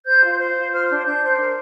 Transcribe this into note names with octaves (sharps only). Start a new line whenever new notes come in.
C5 G6
F4
C5
F4
C5 F6
D4
D4 G6
C5
A#4